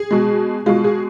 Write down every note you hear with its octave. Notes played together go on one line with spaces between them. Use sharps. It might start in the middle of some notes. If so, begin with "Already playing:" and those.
Already playing: G#4
B2 G#3
B2 G#3 F4
G#4